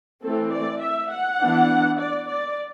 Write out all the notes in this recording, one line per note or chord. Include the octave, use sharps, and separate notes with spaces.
E3 A3 C4 A4
D5
E5
F#5
E3 B3 D4
D5
D5